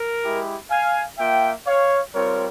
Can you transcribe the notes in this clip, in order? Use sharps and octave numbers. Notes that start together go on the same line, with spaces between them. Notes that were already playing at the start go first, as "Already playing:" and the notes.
Already playing: A#4
G#3 E4 G4
F5 G#5
A#3 F4 E5 G5
C#5 F5
G3 C4 F4 A#4 C#5